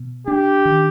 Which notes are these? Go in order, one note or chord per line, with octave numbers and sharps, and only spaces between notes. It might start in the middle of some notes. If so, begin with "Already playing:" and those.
Already playing: B2
D4 G4
D#3